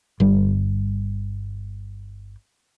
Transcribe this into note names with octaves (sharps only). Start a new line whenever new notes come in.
G1 G3